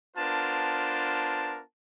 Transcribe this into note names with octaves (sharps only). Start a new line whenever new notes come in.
B3 D4 F4 A#4 C5 A5